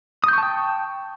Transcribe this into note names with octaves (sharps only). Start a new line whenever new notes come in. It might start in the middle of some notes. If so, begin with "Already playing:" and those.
G5 A5 C#6 D#6 G6